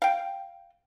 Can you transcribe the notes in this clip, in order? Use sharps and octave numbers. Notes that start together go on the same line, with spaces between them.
F5 G5